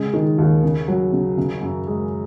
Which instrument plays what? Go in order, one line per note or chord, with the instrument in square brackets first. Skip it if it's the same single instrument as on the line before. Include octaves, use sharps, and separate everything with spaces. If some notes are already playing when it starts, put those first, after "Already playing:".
Already playing: [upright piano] C#3 G#3
D#3
D#2
C#3
F#3
C#3
C#3
F#2
G#3